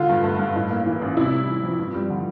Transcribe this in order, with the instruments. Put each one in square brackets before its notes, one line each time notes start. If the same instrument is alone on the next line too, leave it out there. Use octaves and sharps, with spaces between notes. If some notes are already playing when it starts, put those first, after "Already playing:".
Already playing: [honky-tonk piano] D3 F4
G2
A3
G2
A2
A#3
E3
A1
C3 E4
G3
E3
F2
G2
G3
D3